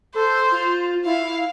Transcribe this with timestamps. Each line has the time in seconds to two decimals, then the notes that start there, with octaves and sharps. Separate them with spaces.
0.15 A4 C5
0.52 F4
1.05 E4 F5